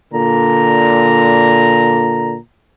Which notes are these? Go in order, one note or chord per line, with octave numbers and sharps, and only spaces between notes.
A#2 D3 A#5